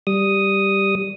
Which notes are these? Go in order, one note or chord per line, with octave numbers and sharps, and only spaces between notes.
G3 D#6